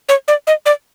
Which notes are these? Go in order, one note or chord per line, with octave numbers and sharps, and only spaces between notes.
C#5
D5
D#5
D5